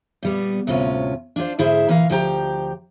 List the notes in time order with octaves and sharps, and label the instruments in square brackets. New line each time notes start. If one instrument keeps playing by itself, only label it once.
[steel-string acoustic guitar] A#2 G3 B3
D2 A2 C3 C#4 F4
D4 F4 C5
G#2 D3 E4 G#4 C5 E5
A#2 E3 A#4 F5
D2 F3 G4 G5 A#5